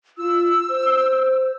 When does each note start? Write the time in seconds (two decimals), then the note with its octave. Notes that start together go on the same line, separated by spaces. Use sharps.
0.18 F4 E6
0.69 C5